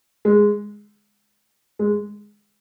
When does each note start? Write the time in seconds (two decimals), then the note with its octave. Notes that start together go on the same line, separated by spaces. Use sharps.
0.25 G#3
1.79 G#3